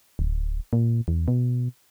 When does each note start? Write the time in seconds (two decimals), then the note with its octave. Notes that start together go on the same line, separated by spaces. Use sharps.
0.19 D1
0.73 A#2
1.08 E2
1.28 B2